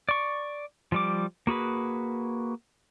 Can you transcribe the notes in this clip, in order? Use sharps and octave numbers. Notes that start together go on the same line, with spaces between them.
D5 C#6
F3 G3 D6
A#3 F#4 G#4 B4